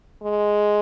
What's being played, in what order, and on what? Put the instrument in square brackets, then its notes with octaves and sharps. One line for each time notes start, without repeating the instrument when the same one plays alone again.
[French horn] G#3